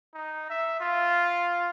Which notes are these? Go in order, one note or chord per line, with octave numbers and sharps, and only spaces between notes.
D#4
E5
F4